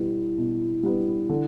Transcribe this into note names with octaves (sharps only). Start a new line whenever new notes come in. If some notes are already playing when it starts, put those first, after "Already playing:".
Already playing: B2 G3 B3 E4
B2
G3 B3
D3